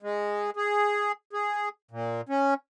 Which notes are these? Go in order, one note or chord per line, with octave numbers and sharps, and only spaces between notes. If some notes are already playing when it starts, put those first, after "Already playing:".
G#3
G#4
G#4
A#2
C#4